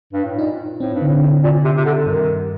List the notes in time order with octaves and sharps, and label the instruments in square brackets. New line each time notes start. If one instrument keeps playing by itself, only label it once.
[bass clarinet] G2
A2
[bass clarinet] A#2 [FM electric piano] D#4
[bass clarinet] A2 [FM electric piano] C4
[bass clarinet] G2
[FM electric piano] D3
[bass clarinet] A2
[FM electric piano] C3
[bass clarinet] A2 [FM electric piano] D3
[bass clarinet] A#2
C3
C3
D3
[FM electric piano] G2 [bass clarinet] D#3